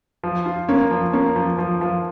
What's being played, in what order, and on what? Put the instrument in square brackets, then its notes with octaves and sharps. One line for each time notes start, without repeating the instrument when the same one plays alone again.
[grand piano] F3
F4
[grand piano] A#3 [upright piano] C#4
[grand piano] F3
[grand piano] A#3 [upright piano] C#4
[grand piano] F3
F3
F3